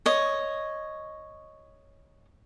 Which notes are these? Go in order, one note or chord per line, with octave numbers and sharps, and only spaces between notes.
C#5 D#5